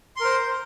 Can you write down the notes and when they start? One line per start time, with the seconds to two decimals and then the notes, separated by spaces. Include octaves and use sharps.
0.16 C6
0.21 A#4
0.25 C5